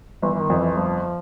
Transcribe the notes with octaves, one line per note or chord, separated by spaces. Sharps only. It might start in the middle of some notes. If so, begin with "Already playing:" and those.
G1 E3
E3
D#3
F2
E3
G1 F3